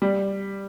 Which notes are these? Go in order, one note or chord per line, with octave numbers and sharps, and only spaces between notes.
G3